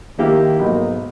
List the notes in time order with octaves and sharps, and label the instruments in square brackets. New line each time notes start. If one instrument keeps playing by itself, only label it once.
[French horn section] D#3 [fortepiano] A#3 E4 G4
[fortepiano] B1 [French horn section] G#2 A#3 D#5